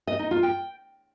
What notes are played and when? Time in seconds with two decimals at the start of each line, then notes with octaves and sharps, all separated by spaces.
0.07 D#5
0.19 D#4
0.31 F4
0.43 G5